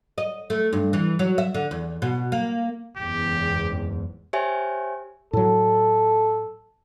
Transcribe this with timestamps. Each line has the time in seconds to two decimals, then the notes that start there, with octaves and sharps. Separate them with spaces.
0.18 D#5
0.50 A3
0.73 G2
0.93 E3
1.19 F#3
1.38 E5
1.55 D3
1.71 E2
2.02 B2
2.32 A#3
2.97 F#1 E2 G#2 G4
4.33 G4 C5 C#5 E5 G#5
5.33 A2 F#3 A4